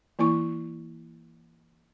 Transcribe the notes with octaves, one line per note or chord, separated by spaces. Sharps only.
E3 A#3 E4 C#6